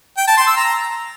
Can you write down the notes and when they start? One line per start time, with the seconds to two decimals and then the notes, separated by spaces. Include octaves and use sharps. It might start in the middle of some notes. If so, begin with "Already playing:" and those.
0.18 G5
0.27 A5
0.37 C6
0.47 E6
0.57 A#5